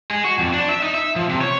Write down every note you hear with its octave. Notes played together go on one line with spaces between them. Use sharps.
G#3
F#4
F2
D4
E5
D#4
E5
F3
C3
C#5